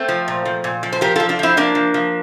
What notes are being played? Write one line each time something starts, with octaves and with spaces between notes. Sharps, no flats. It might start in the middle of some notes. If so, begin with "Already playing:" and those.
Already playing: A3 C4
F3
A#2
F3
A#2
F3
C5
F3 G4 A#4
F3 F4 A4
D4 F4
F3 C4 E4
F3 A#3 D4
F3
F3